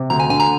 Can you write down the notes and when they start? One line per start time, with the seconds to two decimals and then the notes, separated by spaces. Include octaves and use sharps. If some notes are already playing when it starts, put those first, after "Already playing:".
Already playing: C3
0.10 D2 A#5
0.20 G#5
0.30 D3 G#5
0.40 A#5